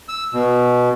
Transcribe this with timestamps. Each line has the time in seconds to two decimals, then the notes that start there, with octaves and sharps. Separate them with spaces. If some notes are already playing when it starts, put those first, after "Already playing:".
0.08 E6
0.33 B2